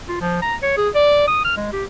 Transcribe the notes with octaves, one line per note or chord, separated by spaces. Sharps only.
F4
F3
A#5
C#5
G#4
D5
D#6
F6
G#3
G4